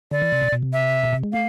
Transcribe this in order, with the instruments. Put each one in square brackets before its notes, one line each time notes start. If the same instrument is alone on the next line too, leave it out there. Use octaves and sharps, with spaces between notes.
[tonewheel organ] D3 [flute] D5
[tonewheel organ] E3
C3
B2
B2
C3
[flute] E5
[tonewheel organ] B2
C3
G#3
[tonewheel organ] A3 [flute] F5